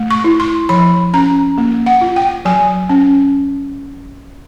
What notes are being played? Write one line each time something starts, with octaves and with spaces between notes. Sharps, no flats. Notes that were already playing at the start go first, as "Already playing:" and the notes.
Already playing: A3
C#6
E4
C6
F3 B5
C#4 A#5
A#3
F#5
F4
G5
F#3 G#5
C#4